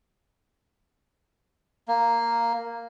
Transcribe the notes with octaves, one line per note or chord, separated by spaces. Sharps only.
A#3